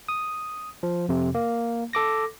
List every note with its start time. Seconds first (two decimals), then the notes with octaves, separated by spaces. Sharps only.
0.09 D#6
0.83 F3
1.09 F2 C3
1.35 A#3
1.93 A4 D6 A#6